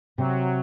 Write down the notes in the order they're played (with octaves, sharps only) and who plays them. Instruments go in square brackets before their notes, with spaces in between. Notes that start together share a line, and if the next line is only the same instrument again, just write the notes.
[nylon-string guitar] C3 [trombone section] F#3